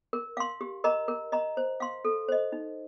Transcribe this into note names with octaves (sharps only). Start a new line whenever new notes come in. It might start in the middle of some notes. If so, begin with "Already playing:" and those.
A#4
F5 C6
G4
A#4 D#5 A#5
A#4
D#5 A#5
C5
F5 C6
A4
C5 D#5
D#4